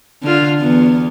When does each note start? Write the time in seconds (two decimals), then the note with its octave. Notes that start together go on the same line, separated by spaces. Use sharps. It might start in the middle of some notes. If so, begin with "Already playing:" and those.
0.23 D3 F4
0.60 E2 B3